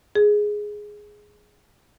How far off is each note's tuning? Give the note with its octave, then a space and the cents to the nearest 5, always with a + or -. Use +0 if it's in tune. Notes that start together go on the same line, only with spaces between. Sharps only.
G#4 +0